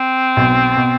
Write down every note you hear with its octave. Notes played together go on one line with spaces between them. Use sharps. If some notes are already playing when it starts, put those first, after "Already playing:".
Already playing: C4
B1 B2
B2